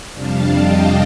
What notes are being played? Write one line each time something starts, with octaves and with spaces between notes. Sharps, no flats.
F2 C3 G3 D4 F5 A5
D#5 G5